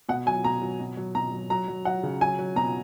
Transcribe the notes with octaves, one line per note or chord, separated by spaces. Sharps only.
B2 F#5
F#3 G#5
B2 A#5
F#3
B2
F#3
B2 A#5
F#3
F#3 A#5
F#3
F#3 F#5
C#3
F#3 G#5
F#3
B2 A#5